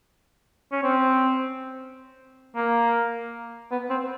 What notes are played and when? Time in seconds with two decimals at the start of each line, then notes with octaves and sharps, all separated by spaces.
0.72 C#4
0.83 C4
2.56 A#3
3.71 B3
3.90 C4